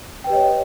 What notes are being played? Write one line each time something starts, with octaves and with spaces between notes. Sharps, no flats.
G4 B4 C#5 D#5 G5